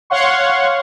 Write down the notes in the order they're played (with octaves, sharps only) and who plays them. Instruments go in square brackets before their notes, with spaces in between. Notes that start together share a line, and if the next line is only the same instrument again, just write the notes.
[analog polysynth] C#5 F5 F#5 C6 C#6